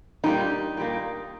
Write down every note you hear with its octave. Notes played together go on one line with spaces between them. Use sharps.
A#2 G3 A#3 D#4
A#2 G3 A#3